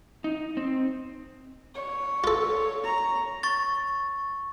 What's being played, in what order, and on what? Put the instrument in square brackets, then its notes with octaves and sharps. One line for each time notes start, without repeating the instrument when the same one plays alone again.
[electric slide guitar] D#4
C4
[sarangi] C#5
[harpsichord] F4 A4
[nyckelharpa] A#5
[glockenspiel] C#6 A6